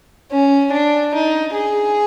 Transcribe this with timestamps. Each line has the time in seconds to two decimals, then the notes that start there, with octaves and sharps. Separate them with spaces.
0.31 C#4
0.72 D4
1.14 D#4
1.54 G#4